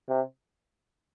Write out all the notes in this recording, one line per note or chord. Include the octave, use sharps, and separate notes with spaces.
C3